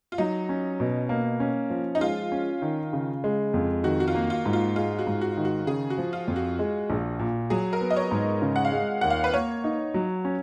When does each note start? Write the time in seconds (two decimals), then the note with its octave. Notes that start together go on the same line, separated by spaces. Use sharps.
0.12 F4
0.18 F#3 D#4
0.49 C#4
0.80 B2
1.09 A#3
1.40 C#4
1.70 F3
1.95 D#4
2.01 G#3 F4
2.32 C#4
2.62 D#3
2.93 C#3
3.24 G#3
3.54 F2
3.84 D#3 F#4
4.00 F#4
4.08 F4
4.15 A#3
4.30 F4
4.46 G#2
4.53 F4
4.76 G#3 F4
4.99 F#4
5.07 G#2
5.21 F#4
5.37 D#3
5.45 F#4
5.67 C#3 G#4
5.90 F#4
5.98 F3
6.13 F4
6.28 F2
6.36 F#4
6.59 G#3
6.90 A#1
7.19 A#2
7.50 F#3 G#4
7.73 A#4
7.81 B3
7.91 D#5
7.96 C#5
8.11 G#2
8.42 C#3
8.56 F#5
8.65 F5
8.72 G#3
9.01 D#2 F#5
9.10 F5
9.24 B4
9.33 A#3 C#5
9.64 D#4
9.94 F#3
10.25 C#4